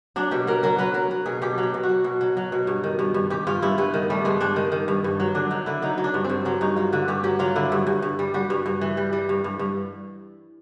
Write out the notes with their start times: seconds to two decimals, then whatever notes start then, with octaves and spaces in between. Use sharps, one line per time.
0.16 F#3 D4
0.31 B2 G4
0.47 F#3 A#4
0.63 F#3 A#4
0.78 F#3 B4
0.94 F#3 A#4
1.11 F#3
1.26 B2 G#4
1.42 B2 G4
1.58 F#3
1.63 G4
1.74 B2
1.83 F#4
1.89 F#3
2.04 B2
2.21 F#3
2.37 F#3
2.52 B2
2.67 G2
2.84 D#3
2.99 G2
3.14 G2
3.30 G2 G4
3.47 G2 F4
3.62 G2 E4
3.78 G2 B3
3.94 D#3
4.10 G3 A3
4.25 G2 G#3
4.40 G2 D4
4.56 D#3
4.72 D#3
4.88 G2
5.04 G2
5.20 F#3
5.35 D3 D4
5.50 F#3 D#4
5.66 D3 E4
5.82 F#3 D#4
5.98 F#3
6.04 D4
6.14 G2
6.24 C4
6.29 G2
6.45 F#3 C#4
6.61 G2 D#4
6.76 F#3 F4
6.92 D3 F#4
7.08 G2 G4
7.23 F#3 G4
7.39 F#3 F4
7.56 D3 E4
7.72 G2
7.87 G2
8.02 G2
8.19 G3
8.34 G3 F#4
8.50 G2
8.66 G2
8.81 E3
8.97 G3
9.13 G3
9.29 G2
9.44 G2
9.59 G2